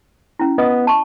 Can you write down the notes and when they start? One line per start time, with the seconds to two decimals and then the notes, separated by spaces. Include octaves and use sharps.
0.39 C#4 E4
0.58 B3 D#5 D#6
0.87 A5 C#6